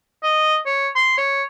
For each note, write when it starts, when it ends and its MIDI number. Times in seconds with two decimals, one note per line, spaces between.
0.23 0.57 75
0.66 0.89 73
0.95 1.16 84
1.18 1.43 73